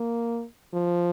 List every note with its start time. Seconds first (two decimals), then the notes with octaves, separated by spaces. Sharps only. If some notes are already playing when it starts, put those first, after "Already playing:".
Already playing: A#3
0.73 F3